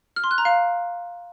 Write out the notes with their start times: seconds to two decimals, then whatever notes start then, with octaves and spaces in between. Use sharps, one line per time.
0.16 F6
0.24 C6
0.31 F#6
0.38 A#5
0.45 F5